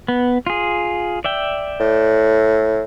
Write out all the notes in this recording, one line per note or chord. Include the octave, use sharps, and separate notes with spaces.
B3
F4 G#4
D5 E5 G5
A2